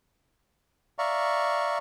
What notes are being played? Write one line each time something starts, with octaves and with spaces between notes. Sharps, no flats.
D5 E5 F5 A#5 C#6